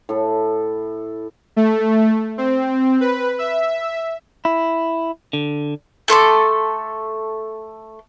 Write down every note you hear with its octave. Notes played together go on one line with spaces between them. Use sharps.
A2 A4
A3
C4
B4
E5
E4
D3
A3 A4 C6 D6